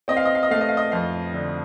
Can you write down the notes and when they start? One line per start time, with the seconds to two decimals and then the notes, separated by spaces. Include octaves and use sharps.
0.08 C4 D#5
0.17 F5
0.25 D#5
0.35 F5
0.43 D#5
0.51 A3 F5
0.61 D#5
0.69 F5
0.77 D#5
0.92 F2 F5
1.34 D3